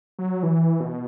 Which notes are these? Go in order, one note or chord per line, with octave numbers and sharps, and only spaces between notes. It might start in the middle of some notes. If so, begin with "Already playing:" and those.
F#3
E3
B2